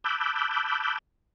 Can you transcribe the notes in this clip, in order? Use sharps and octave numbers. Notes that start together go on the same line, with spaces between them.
A5 B5 D6 E6 F#6 G6